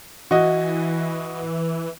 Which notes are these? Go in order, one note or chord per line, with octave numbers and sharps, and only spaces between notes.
E3 F#4 D#5